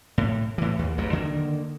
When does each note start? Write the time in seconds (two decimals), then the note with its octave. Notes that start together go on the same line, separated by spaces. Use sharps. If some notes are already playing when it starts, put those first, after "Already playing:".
0.18 A2
0.58 A2 E3
0.79 D#2
0.98 A1 E2 G#2 F#3
1.13 D3 D#3 A#3